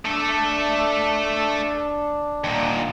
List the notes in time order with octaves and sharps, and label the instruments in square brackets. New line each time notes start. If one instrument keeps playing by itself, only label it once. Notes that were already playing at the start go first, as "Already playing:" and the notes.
[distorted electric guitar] A3 A4 [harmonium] D4
[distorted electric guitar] D#2 A#2